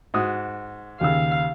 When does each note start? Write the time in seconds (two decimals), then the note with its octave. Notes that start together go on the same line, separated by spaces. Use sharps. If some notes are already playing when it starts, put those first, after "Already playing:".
0.14 G#2 F#4 D#6
1.01 D#2 C#3 F5 E6